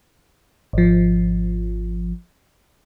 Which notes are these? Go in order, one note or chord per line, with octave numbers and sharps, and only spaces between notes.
G#1 F3